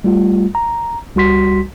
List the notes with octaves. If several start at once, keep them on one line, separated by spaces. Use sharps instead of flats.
G3 A3 F4
A#5
C#2 G3 F#4 C6 B6